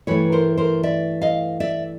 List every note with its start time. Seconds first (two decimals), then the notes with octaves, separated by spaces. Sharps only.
0.07 G2 E3 A3 B4 C#5
0.32 A#4 C5
0.58 A#4 C5
0.83 D5 E5
1.21 D#5 F5
1.60 D5 E5